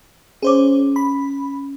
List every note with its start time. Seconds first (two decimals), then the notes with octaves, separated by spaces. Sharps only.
0.42 C#4 G#4 C5 C#5 D6
0.96 B5